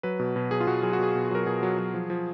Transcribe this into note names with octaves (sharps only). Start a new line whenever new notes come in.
F#3 B4
B2
B2
F#3 G#4
F4
B2 F#4
F#3 G#4
F#4
B2 G#4
B2
F#3 A#4
B2 G#4
F#3
F#3
F3
F3